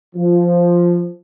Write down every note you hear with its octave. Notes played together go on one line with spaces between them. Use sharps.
F3